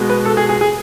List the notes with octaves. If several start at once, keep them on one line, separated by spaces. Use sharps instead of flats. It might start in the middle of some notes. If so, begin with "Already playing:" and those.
Already playing: B2 G#3 B3
B4
A4
G#4
G#4
G#4